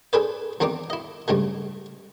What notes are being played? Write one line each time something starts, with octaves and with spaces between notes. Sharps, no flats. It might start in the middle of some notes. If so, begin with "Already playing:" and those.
D4 G#4 A4 B4 C5 D5
E2 D#3 C4 D4 D#4 D6
E4 D#5
G2 C#3 G#3 A3